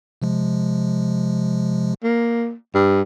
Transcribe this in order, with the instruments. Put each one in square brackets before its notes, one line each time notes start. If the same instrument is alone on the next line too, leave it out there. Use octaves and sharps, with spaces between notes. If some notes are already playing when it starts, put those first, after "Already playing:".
[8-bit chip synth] C3 F3 G#3
[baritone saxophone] A#3
G2